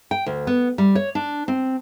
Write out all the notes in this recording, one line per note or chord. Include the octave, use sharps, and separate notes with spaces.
G5
D2
B3
G3
C#5
D4
C4